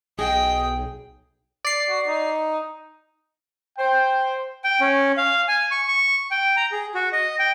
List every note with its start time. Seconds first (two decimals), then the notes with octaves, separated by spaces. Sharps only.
0.19 B1 G#4 D#5 G5
1.65 D5 C7
1.89 F#4
2.07 D#4
3.78 C5 G5
4.64 G5
4.80 C#4
5.17 F5
5.48 G#5
5.71 C#6
5.88 C#6
6.31 G5
6.57 A#5
6.72 G#4
6.94 F#4
7.13 D#5
7.39 G5